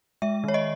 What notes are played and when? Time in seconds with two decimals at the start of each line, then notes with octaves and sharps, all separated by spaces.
0.22 G#3 E5
0.44 D#3 C#5
0.54 D#5